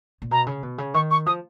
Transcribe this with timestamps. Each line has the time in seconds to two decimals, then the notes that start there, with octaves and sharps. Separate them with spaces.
0.22 A#2
0.31 B2 A#5
0.47 C#3
0.63 B2
0.78 C#3
0.94 D#3 C#6
1.11 C#6
1.26 F3 D#6